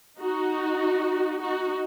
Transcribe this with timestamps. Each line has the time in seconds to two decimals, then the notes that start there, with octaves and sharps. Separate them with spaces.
0.19 D#4 F#4
1.40 D#4 F#4